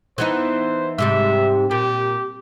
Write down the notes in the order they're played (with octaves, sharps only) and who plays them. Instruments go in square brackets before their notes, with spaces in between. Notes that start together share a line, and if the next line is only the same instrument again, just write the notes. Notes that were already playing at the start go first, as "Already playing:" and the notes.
[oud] E3 B3 D#4 [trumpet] C5
[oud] G#2 C3 G3 [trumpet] E5
[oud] A#2 [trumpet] G4